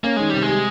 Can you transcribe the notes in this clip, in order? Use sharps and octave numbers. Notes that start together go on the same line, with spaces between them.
A#3 C#4
D#3 G#3
C3 G3
G#3
G3